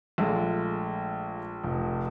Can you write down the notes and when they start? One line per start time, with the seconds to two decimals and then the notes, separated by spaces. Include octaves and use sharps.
0.18 A#1 G#3 A3 F4
1.64 F1